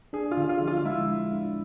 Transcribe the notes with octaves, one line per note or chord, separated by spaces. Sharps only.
D4 G#4
F4
D3
F4
F3
F4
G#3 E4
G#3
D4